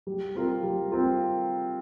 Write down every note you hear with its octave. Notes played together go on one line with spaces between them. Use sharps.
G3
C4 F4 A#4
G3
C4 F4 A#4